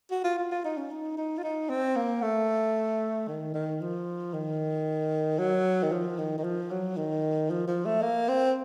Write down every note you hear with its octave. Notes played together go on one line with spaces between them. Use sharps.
F#4
F4
F4
F4
D#4
C#4
D#4
D#4
F4
D#4
C4
A#3
A3
D#3
D#3
F3
D#3
F#3
D#3
F3
D#3
D#3
F3
F#3
D#3
F3
F3
A3
A#3
C4